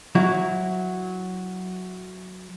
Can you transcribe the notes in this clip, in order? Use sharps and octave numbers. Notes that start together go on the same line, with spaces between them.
F#3 E4 F#4